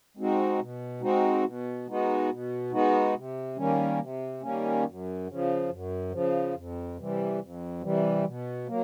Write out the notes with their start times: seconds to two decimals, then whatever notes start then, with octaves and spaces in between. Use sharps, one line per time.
0.17 G#3 C4 D#4 F#4
0.59 B2
1.01 G#3 C4 D#4 F#4
1.44 B2
1.87 G#3 B3 D#4 F#4
2.29 B2
2.72 G#3 B3 D#4 F#4
3.15 C3
3.56 D#3 G3 A#3 C#4
4.00 C3
4.42 D#3 G3 A#3 C#4
4.85 F#2
5.27 C#3
5.32 F3
5.70 F#2
6.11 C#3 F3
6.54 F2
6.97 C3 E3 G3
7.40 F2
7.81 C3 E3 G3
8.25 B2
8.67 F#3 A#3